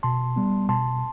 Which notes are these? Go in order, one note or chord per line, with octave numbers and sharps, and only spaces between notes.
B2 A5 C6
G3 B3
B2 A5 C6